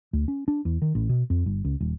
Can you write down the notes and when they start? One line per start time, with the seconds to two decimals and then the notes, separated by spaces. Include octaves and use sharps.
0.13 D2
0.28 C#4
0.48 D4
0.65 E2
0.82 D#3
0.95 A1
1.09 B2
1.30 F2
1.46 G1
1.64 C#2
1.80 D#1